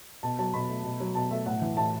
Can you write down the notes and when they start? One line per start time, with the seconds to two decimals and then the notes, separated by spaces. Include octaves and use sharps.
0.23 B2 A5
0.39 F#3 A5
0.54 B2 B5
0.69 A3
0.84 B2
1.00 F#3
1.15 B2 A5
1.31 A3 E5
1.46 A2 F#5
1.62 E3
1.77 A2 A5